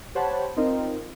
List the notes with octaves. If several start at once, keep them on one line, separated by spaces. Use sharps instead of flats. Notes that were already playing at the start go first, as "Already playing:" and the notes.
G4 C5 C#5 F#5 A5 B5
C4 D#4 F4 A#4